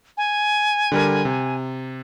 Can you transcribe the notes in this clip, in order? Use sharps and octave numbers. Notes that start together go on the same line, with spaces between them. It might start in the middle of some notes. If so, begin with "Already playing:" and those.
G#5
D3 G3 A#4
C3